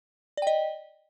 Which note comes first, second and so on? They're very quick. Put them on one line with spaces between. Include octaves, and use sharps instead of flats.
D5 G5 D#5